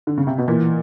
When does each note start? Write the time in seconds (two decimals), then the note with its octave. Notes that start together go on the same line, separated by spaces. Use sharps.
0.07 D3
0.18 C#3
0.27 C3
0.38 B2
0.48 A#2 E3